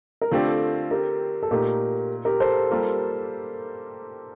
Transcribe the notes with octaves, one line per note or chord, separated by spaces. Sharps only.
A#4
D3 A3 C4 F4 G4 A4 D5
G4 A#4
A4
A#2 A3 D#4 G4 A#4
G4 A#4
A4 C5
G3 A#3 F4 A4